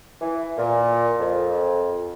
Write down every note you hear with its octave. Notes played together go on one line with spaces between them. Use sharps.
E3
A#2
F2